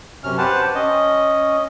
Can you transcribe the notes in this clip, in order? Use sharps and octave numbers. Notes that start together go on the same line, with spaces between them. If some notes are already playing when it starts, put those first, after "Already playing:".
F#2 C3 C#4 F6
G4 B4 C5 F#5 A5
C#4 D#5